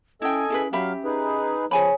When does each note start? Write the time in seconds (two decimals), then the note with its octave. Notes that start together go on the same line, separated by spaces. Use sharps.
0.22 C#4 E4 A4 D#5 G5 G#5
0.50 C#4 E4 G#4 B4
0.73 F#3 G4 E5 F5 B5
1.05 D#4 G#4 B4
1.71 F3 G#4 C#5 G#5 B5